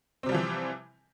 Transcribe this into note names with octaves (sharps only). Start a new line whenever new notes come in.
C3 E3 F3 G3 C4